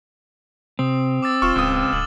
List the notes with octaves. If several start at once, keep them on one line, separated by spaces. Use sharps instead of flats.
C3 C4 D#6
D6 E6 A6
D#1 F4 C#6 F6 E7
D1 C#2 D#6
D1 E7 F#7